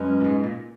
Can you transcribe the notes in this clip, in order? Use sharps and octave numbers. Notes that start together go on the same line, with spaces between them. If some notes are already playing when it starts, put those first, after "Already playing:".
Already playing: F#2 B2 G#3 C#4
A#2
G#2
A#2